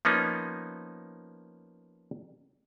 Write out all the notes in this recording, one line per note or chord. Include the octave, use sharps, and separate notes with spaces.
F3 A#3 B3 C#4 D#4